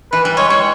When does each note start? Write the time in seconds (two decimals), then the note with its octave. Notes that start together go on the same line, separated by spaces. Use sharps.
0.12 E3 B4
0.25 G3
0.37 G#3 C#5
0.49 G3 C#5